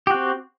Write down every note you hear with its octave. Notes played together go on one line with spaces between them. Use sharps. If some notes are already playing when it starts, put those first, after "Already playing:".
C4 F#4 G4